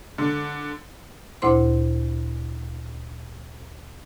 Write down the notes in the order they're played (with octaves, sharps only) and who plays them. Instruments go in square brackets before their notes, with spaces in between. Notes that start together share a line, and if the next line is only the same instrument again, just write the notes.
[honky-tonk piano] D3
[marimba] D2 A#2 E4 C5 C6